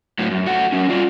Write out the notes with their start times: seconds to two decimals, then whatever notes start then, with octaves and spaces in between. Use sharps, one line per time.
0.19 A2 F#3
0.30 F#2
0.46 A3 F#4 F#5
0.72 F#3 C#4
0.89 G3 F4 D5